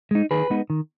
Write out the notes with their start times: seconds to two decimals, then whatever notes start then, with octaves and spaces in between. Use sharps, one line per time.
0.11 G#3 D#4
0.31 D#3 G#4 B4
0.50 G#3 B3 D#4
0.70 D#3